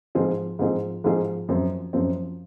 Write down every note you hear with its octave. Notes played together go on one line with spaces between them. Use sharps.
G#2 F3 C4 F4 G#4
G#2 F3 C4 F4 G#4
G#2 F3 C4 F4 G#4
F#2 F3 C4
F#2 F3 C4